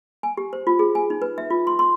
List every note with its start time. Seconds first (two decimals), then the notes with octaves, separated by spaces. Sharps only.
0.23 G#5
0.37 G4
0.53 C5
0.67 F4
0.79 G#4
0.95 G#5
1.10 D#4
1.22 B4
1.38 E5
1.50 F4
1.67 C6
1.79 C6